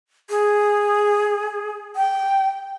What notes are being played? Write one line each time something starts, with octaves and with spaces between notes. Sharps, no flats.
G#4
G5